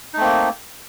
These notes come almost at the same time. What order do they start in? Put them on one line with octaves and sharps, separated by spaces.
D#4 A3 C4 A#3